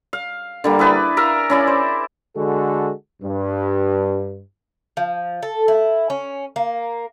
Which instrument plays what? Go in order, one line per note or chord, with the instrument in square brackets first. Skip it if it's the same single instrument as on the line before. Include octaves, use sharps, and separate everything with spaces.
[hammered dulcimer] F5
D3 G3 A#3
E4 G#4 B4 D5
A#4 E5 F5
C#4 E4 D5
C5
[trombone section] D3 G#3 F#4 A4
G2
[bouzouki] F3
A4
E4
C#4
A#3